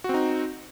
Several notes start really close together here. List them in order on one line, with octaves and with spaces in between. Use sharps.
F#4 C4 D#4